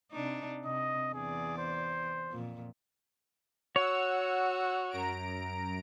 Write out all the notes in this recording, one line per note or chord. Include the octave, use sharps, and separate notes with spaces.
C3 D4 D#4
C3 D#5
E2 G#4 D5
C5
F2 A#2
F#4 C#5 F#5 E6
F#2 A#5 D7